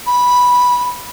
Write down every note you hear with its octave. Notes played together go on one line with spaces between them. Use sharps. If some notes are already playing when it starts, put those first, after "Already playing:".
B5